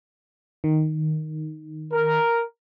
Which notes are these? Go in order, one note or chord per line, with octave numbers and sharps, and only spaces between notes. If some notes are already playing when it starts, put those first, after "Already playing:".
D#3
A#4